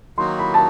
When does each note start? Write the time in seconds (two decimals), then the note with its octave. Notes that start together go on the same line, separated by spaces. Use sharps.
0.18 D#3 F#3 A#3 D#4 F#4 C6
0.39 B5
0.54 A5